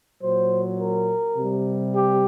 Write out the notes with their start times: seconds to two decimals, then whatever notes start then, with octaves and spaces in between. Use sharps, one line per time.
0.21 A#2 F#3 C5
0.79 A#4
1.37 C3 G3
1.96 G4